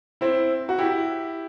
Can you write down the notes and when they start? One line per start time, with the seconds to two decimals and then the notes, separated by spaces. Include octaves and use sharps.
0.21 C4 E4
0.69 F#4
0.78 E4 G4